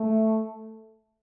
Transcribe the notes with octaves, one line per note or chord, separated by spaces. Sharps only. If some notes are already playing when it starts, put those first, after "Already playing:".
Already playing: A3